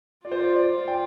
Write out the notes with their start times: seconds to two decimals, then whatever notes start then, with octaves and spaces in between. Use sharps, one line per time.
0.25 F4 D5
0.32 C5
0.39 D5
0.56 D5
0.73 F4
0.88 G5